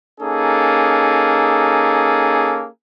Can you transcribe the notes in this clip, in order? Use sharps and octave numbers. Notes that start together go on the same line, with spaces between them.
A#3 C#4 D#4 G#4 A4